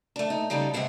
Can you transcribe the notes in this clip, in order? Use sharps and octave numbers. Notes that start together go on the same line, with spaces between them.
A3 D4
D#4
C#3 G3 D#4 G4 A4
G#2 C3 G#3 G#4 F#5